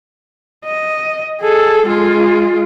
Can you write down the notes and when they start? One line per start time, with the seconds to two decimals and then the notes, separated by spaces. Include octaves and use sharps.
0.65 D#5
1.41 G#4 A4
1.85 G#3 F4